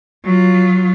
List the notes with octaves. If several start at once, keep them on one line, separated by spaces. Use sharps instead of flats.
F#3 F4